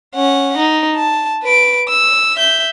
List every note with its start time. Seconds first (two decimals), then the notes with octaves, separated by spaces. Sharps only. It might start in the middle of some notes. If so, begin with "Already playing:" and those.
0.15 C#4 F#5
0.58 D#4
0.96 A5
1.43 B4 D7
1.89 E6
2.36 E5 G6